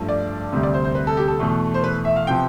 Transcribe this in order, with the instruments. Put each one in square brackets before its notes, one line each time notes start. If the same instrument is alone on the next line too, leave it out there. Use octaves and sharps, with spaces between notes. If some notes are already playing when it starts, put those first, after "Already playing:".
Already playing: [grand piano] G2 F3 A3
D5
D2 C3 G3
D5
C5
C5
B4
A4
G4
A4
E2 B2 A3
C5
B4
E5
F5
C3 F3 B3 G5